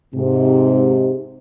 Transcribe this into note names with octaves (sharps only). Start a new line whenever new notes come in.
G#2 C3